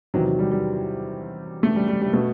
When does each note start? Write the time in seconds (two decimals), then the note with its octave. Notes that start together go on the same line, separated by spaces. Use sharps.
0.14 E2 C3 D#3 F#3
0.26 F#3
0.39 G3
0.51 G3
1.63 A3
1.76 G3
1.88 G3
2.01 G3
2.13 B2 A3